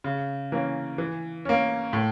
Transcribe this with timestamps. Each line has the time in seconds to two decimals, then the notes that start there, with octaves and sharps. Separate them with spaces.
0.04 C#3
0.52 E3 A#3 C#4
0.98 E3
1.45 A#3 C#4
1.93 A2